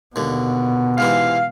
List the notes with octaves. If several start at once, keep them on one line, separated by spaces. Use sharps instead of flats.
D#2 B2 D3
G#2 C3 E3 F5